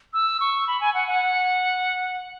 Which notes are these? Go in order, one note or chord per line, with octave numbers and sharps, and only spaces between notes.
E6
C#6
B5
G#5
F#5
F#5